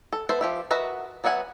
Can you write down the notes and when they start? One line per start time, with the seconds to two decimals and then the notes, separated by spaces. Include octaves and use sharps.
0.13 A4
0.29 B3 A4 C5 E5
0.41 F3 G4 E5
0.71 F#4 A#4 B4 D#5 E5
1.24 F#3 B3 E5 F#5 G#5